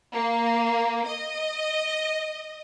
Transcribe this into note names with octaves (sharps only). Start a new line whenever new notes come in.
A#3
D#5